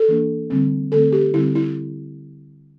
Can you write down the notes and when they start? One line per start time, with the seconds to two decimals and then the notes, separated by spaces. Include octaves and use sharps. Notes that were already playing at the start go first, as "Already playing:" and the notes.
Already playing: A4
0.08 E3 A#3 D4
0.50 D3 G3 C4
0.92 D3 A3 C4 A4
1.12 G4
1.34 D3 G3 C4 E4
1.55 E4